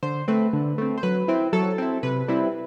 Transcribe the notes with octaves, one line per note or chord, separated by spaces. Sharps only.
D3 C5
A3 C4 B4
D3
A3 C4
C5
F#3 B4
C4 E4
F#3 A4
C4 E4
C3 B4
G3 C4 E4